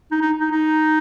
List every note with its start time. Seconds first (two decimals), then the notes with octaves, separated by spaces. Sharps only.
0.11 D#4
0.21 D#4
0.40 D#4
0.51 D#4